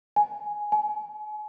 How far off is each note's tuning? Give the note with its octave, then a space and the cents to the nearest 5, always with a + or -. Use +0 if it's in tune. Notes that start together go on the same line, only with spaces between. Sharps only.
G#5 +0
G#5 +40